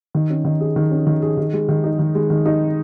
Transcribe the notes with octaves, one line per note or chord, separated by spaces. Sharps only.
D#3
C#4
D#3
G#4
D#3
C#4
D#3
G#4
D#3
G#3
D#3
D#4
D#3
G#3
D#3
D#4